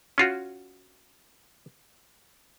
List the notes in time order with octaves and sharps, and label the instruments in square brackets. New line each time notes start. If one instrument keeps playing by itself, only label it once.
[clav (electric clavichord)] C#4 F4 F#4